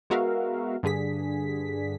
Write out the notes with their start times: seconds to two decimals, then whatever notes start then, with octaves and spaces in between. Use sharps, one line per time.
0.10 G#3 B3 F#4 A#4 E5 F5
0.83 G2 D3 G#4 B6